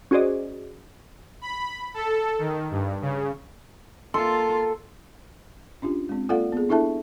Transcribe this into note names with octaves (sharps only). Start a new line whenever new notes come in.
C#4 F#4 G#4 C5 D5 D#5
B5
A4
D#3
G2
C#3
A#3 F4 A4 C6
C#4 D4 F4 G4
G#3 C4
A#3 F4 A4 D5 F5 F#5
B3 G#4
D4 E4 A4 E5 A5